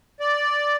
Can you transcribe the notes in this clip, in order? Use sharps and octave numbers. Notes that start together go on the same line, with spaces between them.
D5